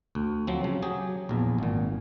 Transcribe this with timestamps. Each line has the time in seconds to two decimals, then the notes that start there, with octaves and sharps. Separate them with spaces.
0.15 D2
0.47 F3 F#3 C4
0.64 C#3
0.82 F#3 G4 G#4
1.29 A#1 E2
1.58 G#1 A#2